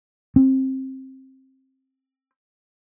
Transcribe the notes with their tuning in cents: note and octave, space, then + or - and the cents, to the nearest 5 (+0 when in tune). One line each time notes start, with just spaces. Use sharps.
C4 +20